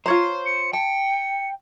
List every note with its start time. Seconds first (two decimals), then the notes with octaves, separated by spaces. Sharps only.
0.06 F4 C5 C#5 A#5
0.46 C#7
0.73 G5 A5 C#7